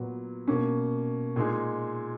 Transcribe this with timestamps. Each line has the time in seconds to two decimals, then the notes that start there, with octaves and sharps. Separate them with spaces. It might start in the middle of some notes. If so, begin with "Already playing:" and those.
Already playing: A#2 F#3 B3
0.48 B2 A#3 C#4
1.36 A#2 G#3 D#4 G#4